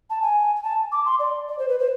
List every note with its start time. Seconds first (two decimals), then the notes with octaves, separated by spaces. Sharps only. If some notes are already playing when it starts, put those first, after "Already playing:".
0.10 A5
0.22 G#5
0.56 G#5
0.63 A5
0.92 D6
1.06 C6
1.19 D5
1.48 D5
1.59 C5
1.68 B4
1.79 C5